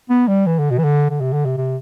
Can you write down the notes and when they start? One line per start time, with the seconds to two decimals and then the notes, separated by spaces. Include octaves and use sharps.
0.10 B3
0.28 G3
0.46 E3
0.59 D3
0.71 B2
0.78 E3
0.84 D3
1.10 D3
1.21 C3
1.33 D3
1.45 C3
1.57 C3